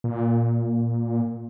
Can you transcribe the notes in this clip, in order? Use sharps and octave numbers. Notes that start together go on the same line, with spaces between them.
A#2